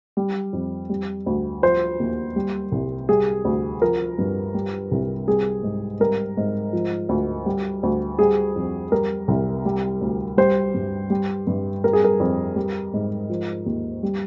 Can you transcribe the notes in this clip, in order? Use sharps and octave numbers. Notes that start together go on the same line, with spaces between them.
G3
F2
G3
D2
F3 C5
D#2
G3
C2
G3 G#4
D2
F3 A#4
G2
G3
C2
G3 G#4
G#2
G3 A#4
G#2
F3
D2
G3
D2
G3 G#4
F2
G3 A#4
C2
G3
D2
G3 C5
G2
G3
G2
G3 A#4
G#4
A#4
F2
G3
G#2
F3
D#2
G3